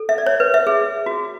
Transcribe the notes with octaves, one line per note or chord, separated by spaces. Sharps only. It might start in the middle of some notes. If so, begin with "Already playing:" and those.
Already playing: A4
E5
D5
C#5
B4
E5
G#4
F#4